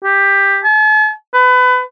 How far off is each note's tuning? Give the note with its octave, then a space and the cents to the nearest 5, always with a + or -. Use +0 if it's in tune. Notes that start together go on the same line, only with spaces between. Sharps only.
G4 +10
A5 -45
B4 +25